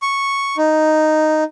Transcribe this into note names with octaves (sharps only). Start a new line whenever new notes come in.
C#6
D#4